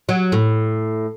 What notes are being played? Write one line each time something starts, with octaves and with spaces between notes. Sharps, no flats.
F#3
A2